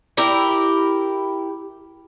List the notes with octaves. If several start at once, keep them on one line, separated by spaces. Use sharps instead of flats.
E4 G4 A#4